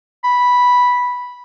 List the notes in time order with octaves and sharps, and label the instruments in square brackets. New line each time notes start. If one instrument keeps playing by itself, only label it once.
[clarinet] B5